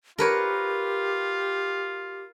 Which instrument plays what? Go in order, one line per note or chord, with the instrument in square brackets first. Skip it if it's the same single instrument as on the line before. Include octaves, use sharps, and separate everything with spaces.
[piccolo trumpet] F4 [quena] G4 [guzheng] A#4 B4 C#5